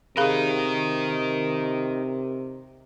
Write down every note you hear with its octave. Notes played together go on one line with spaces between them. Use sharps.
C3 D#4 G#4 A#4 F5 B5